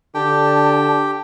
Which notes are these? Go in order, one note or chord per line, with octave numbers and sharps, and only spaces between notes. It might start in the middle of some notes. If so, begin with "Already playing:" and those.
D3 G4 G5 A5